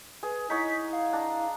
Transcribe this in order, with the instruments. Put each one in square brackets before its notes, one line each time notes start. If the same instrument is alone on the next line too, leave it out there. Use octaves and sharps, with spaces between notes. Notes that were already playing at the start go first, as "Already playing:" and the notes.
[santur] G#4 [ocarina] B4
[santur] D#4 C#5 F#5 [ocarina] E4 [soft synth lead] B6
[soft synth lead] F5
[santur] D4 A#5